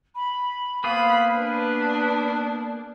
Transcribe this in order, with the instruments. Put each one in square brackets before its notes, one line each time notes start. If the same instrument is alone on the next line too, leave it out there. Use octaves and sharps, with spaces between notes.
[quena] B5
[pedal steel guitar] A#3 B3 G#4 [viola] C5 B5 [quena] F5
[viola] D4 [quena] B4